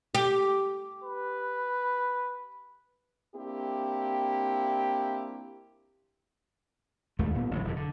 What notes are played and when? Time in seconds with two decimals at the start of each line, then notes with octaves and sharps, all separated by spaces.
0.15 G4
1.04 B4
3.35 A#3 C4 D4 E4 G4
7.19 D#1 D#2 G#3 A3
7.35 D#1 A#2 B3
7.51 A1 D3 F#3
7.64 E1 F#2 C#3
7.76 D3